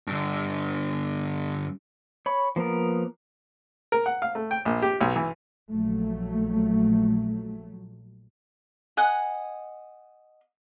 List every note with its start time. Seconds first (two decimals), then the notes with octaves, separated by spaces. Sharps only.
0.07 G2 D3
2.26 C#5 B5
2.56 F3 A#3 B3 A#4
3.92 A#4
4.06 F#5
4.22 F5
4.35 A3
4.51 G5
4.65 A#1
4.82 G4
5.01 B1
5.16 E3
5.71 A#1 F#3 A3
8.97 D#5 F#5 G#5